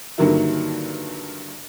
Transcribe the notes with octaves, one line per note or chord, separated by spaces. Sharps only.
G2 D3 D#3 F#3 A#3 E4